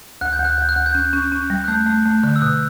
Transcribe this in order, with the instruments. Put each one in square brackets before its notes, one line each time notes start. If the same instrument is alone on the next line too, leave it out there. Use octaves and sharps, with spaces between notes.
[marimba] D2 [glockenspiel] F#6
[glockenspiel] G6
[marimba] D2
[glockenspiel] F#6
[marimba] D2 [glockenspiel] G6
[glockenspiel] F#6
[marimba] D2
[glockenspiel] G6
[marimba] C#4 [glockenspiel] F#6
[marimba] C#4
C#4
G3
[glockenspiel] F#6
[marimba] A3 [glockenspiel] G6
[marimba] A3
A3
D3
[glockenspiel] E6
[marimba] B2 [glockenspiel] F#6